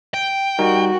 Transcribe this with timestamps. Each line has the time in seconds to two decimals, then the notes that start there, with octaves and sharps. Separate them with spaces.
0.14 G5
0.59 G3 D#4 F#4 A#4